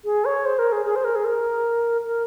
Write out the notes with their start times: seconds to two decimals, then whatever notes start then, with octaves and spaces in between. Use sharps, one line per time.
0.05 G#4
0.25 C#5
0.46 C5
0.59 A#4
0.72 G#4
0.85 G#4
0.96 C5
1.05 A#4
1.16 G#4
1.25 A#4
2.05 A#4